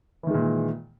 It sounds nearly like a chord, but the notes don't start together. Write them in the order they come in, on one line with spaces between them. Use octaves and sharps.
E3 D#3 G#3 A#2